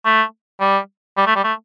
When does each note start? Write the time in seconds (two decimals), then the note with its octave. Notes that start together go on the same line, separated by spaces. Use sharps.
0.05 A3
0.61 G3
1.17 G3
1.27 A3
1.36 G3
1.44 A3